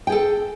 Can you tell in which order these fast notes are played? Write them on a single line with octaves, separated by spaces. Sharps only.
G5 G#4 A4